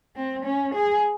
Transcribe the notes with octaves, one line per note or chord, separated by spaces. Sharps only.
C4
C#4
G#4